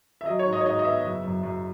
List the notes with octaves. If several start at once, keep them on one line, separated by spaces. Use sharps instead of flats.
E5
F#3 D#5
C#5
G#2
D#5
C#5
G#2 D#5
D#5
B3 E5
F#1
F#2
F#2